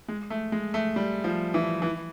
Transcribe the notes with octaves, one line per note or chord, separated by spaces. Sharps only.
G#3
A3
G#3
A3
G3
F3
E3
E3